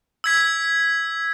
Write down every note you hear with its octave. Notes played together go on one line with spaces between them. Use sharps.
E6 G#6 B6